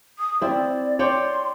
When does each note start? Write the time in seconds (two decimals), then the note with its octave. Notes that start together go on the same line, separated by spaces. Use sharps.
0.19 D#6
0.41 C4 E4 D5
0.99 C#5 D5 G5 C6